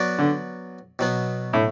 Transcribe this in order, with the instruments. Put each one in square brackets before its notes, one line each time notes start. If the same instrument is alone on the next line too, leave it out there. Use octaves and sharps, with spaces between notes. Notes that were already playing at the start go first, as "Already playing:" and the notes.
Already playing: [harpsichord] F#3 B3 F#4 B4 D5
[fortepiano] D3
[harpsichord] B2 F#3 B3
[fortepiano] A2